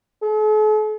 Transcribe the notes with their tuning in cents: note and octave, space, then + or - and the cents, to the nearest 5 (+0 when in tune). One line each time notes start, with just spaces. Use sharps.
A4 -45